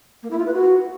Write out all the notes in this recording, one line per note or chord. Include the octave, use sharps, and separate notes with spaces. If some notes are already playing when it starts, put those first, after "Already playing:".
A#3
E4
F4
B4
F#4